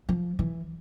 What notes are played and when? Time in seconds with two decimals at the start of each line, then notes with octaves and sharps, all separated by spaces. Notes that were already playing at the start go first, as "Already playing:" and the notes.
0.09 F3
0.39 E3